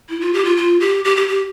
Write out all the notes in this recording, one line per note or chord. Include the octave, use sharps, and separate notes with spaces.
E4
F4
G4
F4
F4
G4
G4
G4
G4